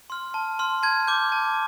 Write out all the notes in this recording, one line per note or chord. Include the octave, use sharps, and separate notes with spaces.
C6 F6
A5
C6 F6
A5 G#6
D6 G6
A5